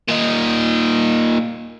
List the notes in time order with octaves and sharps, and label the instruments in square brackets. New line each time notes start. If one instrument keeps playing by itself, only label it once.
[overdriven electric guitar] A#2 D#4